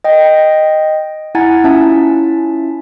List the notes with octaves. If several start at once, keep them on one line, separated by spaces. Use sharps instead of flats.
D#5 G5
E4 F#5 G#5 A#5 G#6 A6
C#4 E4 F4 E5 A5